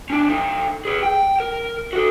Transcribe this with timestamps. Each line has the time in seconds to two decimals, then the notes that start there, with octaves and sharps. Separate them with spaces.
0.10 C#4 D4
0.28 F3 D#4
0.85 G#4 B4
1.03 G5
1.40 A#4
1.93 F#4 A4